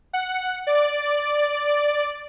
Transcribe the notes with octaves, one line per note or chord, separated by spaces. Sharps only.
F#5
D5